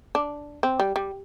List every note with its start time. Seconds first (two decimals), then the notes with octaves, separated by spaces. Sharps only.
0.15 D4
0.63 C4
0.80 G3
0.96 G3